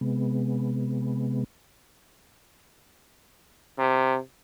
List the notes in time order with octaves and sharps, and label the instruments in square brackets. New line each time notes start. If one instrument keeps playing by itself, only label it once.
[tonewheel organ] C3 G#3 B3
[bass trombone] C3